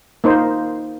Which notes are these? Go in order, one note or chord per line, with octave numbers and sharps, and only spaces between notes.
A#3 D#4 C5